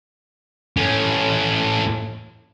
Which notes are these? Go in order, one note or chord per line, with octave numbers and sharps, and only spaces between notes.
A2 C#4